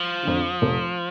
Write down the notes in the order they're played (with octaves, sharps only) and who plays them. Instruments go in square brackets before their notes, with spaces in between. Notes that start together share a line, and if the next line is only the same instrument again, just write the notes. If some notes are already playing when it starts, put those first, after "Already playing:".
Already playing: [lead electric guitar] F3
[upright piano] F2 D3
F1